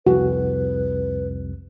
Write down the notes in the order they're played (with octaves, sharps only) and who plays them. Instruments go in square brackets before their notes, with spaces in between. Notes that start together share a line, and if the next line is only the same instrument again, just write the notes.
[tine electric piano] C2 F2 [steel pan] F#4 [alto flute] B4